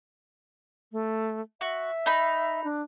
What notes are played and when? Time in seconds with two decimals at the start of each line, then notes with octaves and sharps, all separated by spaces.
0.92 A3
1.61 F#4 E5
2.06 D#4 B5
2.64 D4